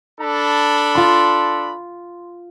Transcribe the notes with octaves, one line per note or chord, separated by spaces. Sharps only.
D4 A4 B5
F4 C6